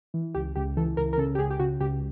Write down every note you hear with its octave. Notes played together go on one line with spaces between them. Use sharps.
E3
C#2 G4
C#2 G4
E3 A4
C#2 A#4
A#4
C#3 A4
G4
C#2 G#4
G4
C#3 F#4
C#2 G4